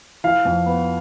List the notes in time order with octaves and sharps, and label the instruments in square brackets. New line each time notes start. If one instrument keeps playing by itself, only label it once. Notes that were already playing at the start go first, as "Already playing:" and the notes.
[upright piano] E3 [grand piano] F5
[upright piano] F2
B3